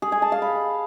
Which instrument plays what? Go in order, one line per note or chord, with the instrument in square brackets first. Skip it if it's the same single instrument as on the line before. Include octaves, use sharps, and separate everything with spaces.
[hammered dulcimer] G#4
G#5
A5
F5
B5